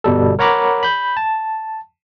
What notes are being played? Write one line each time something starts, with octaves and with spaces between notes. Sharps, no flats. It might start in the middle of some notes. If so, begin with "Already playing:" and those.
G1 B2 G3 A4
A#4 C#5 F#5 A#5 B5 D6
B5 G6
A5